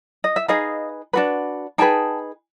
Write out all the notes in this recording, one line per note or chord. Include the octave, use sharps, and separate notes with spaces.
D#5
E5
D#4 G#4 B4 D#5 F5
D4 F#4 B4
D#4 G#4 B4 G5 A5